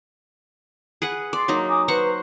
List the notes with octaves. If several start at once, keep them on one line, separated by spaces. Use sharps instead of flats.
G#4 B4 F#5
D5 C6
F#3 A#3 D#4
G#5 D6 D#6
B4 C5 F#5 A#5 C#6